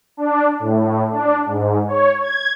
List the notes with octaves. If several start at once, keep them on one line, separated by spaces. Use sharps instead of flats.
D4
A2
D4
G#2
C#5
G#6